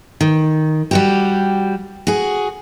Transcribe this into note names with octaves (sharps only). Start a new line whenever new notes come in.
D#3
G3 F#4 G4
F#4 G#4